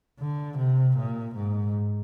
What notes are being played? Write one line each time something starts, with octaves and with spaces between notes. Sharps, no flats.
D3
C3
A#2
G#2